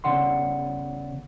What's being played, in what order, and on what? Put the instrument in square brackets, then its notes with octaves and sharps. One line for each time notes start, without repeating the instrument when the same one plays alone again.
[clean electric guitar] E2 A#2 C#3 D5 F#5 C6